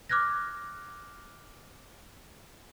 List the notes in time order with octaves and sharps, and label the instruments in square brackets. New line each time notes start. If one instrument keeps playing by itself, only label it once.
[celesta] D6 F6 F#6 G#6 A#6